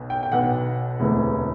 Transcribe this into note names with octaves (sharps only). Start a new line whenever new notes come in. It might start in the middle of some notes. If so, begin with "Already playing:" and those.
Already playing: B1 B2
G5
G5
B1 B2 F#5
E1 D2 C3 E3